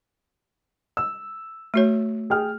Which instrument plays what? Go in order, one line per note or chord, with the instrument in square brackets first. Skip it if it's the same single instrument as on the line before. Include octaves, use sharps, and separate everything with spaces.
[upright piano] E6
[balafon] A3 F#4 C#5
[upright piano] G#4 G5 F6